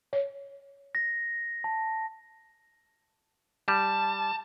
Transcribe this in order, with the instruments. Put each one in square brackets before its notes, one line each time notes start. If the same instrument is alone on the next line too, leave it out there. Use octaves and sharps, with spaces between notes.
[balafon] C#5
[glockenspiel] A#6
A5
[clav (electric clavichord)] G3 [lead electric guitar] A5